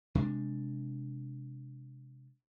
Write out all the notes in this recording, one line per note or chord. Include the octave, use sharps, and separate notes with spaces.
C3 G#3 B3 D4